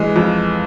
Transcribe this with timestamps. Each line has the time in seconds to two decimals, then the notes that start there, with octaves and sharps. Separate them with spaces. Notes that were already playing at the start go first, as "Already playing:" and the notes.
Already playing: E3 G#3
0.16 F2